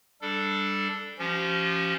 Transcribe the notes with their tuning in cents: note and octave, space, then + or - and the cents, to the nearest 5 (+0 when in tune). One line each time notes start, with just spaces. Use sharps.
G3 +0 D4 +0 A4 +0
F3 -20 C#4 +0 G4 -45